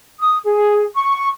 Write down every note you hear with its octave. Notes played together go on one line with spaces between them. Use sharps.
D#6
G#4
C#6